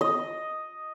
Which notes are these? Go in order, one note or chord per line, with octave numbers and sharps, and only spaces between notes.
D#5